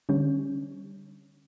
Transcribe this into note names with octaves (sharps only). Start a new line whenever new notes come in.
D3 G3 C#4